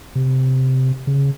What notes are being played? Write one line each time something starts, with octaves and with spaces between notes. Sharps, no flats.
C3
C#3